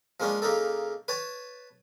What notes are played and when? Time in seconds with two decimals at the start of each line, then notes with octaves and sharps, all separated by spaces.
0.20 F3 G#3 A#3 C#4 D4
0.42 C#3 A#3 D#4 A4
1.08 B4 C#5 A5